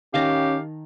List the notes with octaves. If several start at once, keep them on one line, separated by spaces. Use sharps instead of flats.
D#3 C#4 G4 F5 A5 A#5